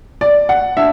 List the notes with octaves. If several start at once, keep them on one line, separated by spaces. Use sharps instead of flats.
D5
F#5
D4 E5